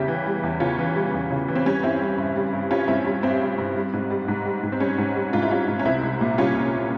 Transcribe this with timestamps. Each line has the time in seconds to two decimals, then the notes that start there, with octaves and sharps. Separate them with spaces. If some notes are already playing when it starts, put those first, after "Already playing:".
Already playing: E2 C#3 G3 E4 G4
0.08 E3
0.26 G3
0.43 E2
0.60 C#3 C#4 F4
0.78 E3
0.96 G3
1.14 E2
1.30 C#3
1.48 E3
1.55 C4
1.65 G3 C#4
1.83 G2 C4 E4
2.01 G3
2.18 G2
2.36 G3
2.53 G2
2.71 G3 C#4 F4
2.88 G2 C4 E4
3.05 G3 C#4
3.23 G2 C4
3.41 G3
3.58 G2
3.76 G3
3.93 G#2
4.10 G3
4.28 G#2
4.45 G3
4.63 G#2
4.72 C4
4.80 G3 C#4
4.98 G#2
5.15 G3
5.33 G#2 F4
5.42 E4
5.51 G3 C#4 F4
5.68 G#2
5.79 C#4
5.85 C2 C4 E4
6.03 C2
6.21 A#2
6.38 G3 C#4 F4
6.55 C2